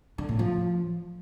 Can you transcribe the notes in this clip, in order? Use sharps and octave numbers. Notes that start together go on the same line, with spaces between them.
D3
A2
F3